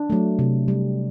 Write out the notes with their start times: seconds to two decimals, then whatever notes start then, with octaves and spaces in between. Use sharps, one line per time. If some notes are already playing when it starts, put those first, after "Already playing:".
Already playing: D4
0.10 F#3 A3
0.39 C3
0.68 G3